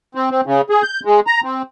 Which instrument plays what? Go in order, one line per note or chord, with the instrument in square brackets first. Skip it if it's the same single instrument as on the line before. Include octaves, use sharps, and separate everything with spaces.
[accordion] C4
C4
C#3
G#4
G6
G#3
A#5
C4